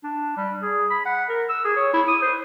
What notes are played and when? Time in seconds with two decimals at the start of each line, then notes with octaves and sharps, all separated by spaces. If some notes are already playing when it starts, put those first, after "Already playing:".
0.04 D4
0.37 G3
0.62 G#4
0.91 B5
1.05 F#5
1.29 A#4
1.49 E6
1.65 G#4
1.77 C#5
1.94 E4
2.08 D#6
2.22 C5